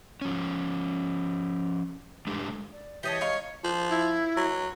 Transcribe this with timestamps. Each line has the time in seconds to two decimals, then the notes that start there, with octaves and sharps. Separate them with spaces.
0.22 F3 C#4
2.27 G#3 A3 D4 G4
2.72 D5
3.03 E3 G4 C#5 D#5 A5
3.21 D#4 F5 C#6
3.64 F3
3.90 E4
4.37 F#3